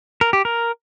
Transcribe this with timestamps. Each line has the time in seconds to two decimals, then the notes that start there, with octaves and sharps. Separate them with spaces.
0.21 A#4
0.33 G4
0.45 A#4